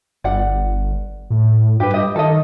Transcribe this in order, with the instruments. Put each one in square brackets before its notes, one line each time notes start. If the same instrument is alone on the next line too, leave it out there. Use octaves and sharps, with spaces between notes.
[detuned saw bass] G1 [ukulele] D5 F#5
[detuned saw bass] A2
[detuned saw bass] G2 [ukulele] G4 B4
[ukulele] G4 D#5
[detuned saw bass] D#3 [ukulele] A4 D#5